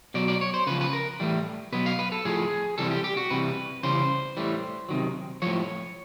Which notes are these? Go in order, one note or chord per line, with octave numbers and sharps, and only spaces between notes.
B2 F#3 D5
D5
C#5
C5
C#3 F3 B4
B4
A#4
A2 E3 G3
B2 F#3 B4
F5
B4
A4
A2 F3 G#4
C3 E3 G3 A4
G4
G4
F#4
C3 E3 G3 B4
C#3 E3 G3 C5
A2 E3 G3
C3 D#3 F#3
A2 F3 C#5